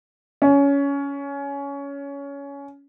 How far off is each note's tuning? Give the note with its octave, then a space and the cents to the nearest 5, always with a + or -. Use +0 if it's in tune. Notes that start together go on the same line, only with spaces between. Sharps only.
C#4 +20